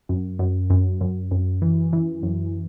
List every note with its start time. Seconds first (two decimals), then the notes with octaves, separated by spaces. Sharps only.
0.09 F#2
0.39 F#2
0.70 F#2
1.01 F#2
1.31 F#2
1.62 E3
1.93 E3
2.23 F#2